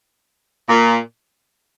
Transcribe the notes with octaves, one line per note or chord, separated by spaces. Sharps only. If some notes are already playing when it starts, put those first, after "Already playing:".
A#2